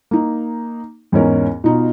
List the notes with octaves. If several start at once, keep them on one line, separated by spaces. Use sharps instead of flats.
A#3 D#4
E2 G#2 C#4 A#4
B2 D#4 F4